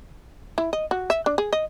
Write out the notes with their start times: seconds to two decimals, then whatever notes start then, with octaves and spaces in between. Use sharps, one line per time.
0.58 E4
0.73 D#5
0.91 F#4
1.10 E5
1.26 D4
1.38 G#4
1.53 D#5